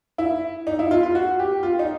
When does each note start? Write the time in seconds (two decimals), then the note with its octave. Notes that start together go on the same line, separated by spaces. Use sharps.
0.18 E4
0.67 D#4
0.79 E4
0.91 F4
1.03 F4
1.15 F#4
1.39 G4
1.63 F4
1.79 D#4